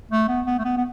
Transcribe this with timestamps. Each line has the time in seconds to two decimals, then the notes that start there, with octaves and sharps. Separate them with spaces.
0.11 A3
0.28 B3
0.46 B3
0.58 A3
0.64 B3
0.77 B3